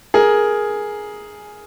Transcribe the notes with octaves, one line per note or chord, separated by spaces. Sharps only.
G#4 A#4